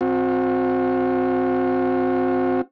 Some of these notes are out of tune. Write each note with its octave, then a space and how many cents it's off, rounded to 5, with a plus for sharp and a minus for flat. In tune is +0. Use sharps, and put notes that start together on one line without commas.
C4 +0 F#4 -40